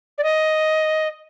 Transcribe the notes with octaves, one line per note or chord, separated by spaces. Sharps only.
D5
D#5